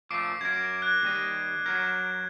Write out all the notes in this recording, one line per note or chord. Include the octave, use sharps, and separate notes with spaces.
A#2 F3 A3 D6 C7 D7
F#2 A#4 G#6
F#6 G#6
D#2 G3 D#5
F#3 A#4 G#6